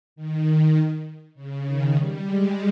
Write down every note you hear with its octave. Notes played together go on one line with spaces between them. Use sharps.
D#3
C#3
D#3
G3
G#3